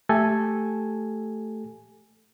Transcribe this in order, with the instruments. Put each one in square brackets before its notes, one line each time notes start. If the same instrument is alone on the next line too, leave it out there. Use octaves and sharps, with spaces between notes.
[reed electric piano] A3 G4 A4 G#5